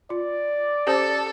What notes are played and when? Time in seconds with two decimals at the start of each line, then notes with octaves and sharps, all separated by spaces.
0.10 F4 D5
0.87 C#4 G4 A4 C5